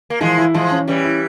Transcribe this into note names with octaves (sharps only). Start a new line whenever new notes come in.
A#3
E3 F3 G#3
E4
E3 F3 G#3
C#4
E3 G3 C#4
E4